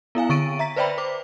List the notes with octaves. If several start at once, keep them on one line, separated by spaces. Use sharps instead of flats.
B3 E4 F5 G#5
D3 C#6 A6 D7 D#7
E5 A#5 B6
B4 C5 D5 E5 G5 B5
C5 D6